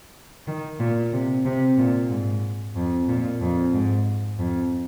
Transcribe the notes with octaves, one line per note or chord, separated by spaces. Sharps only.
D#3
A#2
C3
C3
A#2
G#2
F2
A#2
F2
G#2
F2